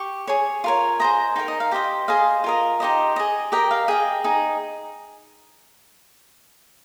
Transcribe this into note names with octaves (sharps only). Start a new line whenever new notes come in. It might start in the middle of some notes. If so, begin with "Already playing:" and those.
Already playing: G4 C#6
G#4 C#5
F4 A#4 C#5
G#4 C5 D#5 A#5
D#4 G4 A#4 G5
D#5
F5
G4 C5 D#5 G5
G#4 C5 D#5 F5
F4 A#4 D#5
D#4 G4 C5 D#5
G#4 D#5
G4 A#4 D#5 G5
F5
G#4 D#5 G5
D#4 G#4 D#5